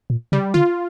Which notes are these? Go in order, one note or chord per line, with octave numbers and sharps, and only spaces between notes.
A#2
C#3 G3
D3 F4